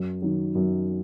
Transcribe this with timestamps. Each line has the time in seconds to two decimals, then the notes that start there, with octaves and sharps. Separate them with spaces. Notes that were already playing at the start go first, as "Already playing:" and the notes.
Already playing: F#2
0.22 D#3 F#3
0.55 F#2